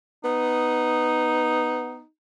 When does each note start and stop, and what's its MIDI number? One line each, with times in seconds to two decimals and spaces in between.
0.24 2.01 59
0.24 2.07 63